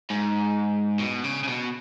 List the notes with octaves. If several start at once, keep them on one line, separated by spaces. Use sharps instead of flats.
G#2
B2
C#3
C#3
B2